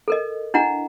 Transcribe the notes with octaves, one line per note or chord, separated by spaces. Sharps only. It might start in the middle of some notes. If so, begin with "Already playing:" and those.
A4 A#4 D#5
D4 E4 D#5 F#5 A#5